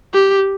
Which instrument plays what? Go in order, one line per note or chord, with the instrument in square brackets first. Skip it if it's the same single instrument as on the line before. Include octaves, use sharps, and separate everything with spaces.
[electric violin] G4